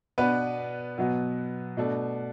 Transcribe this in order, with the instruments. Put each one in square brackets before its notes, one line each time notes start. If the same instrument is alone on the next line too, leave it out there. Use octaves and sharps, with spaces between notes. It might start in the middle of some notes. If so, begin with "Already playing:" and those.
[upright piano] B2 B3 D4 B4
B2 F#3 B3
B2 A3 D4